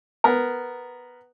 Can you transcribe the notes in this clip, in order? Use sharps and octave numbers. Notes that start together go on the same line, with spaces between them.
B3 A#4